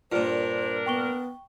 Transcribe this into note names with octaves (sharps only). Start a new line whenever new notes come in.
G2 A#2 D4 F4 A#4 C5
B3 G5 C#6 G7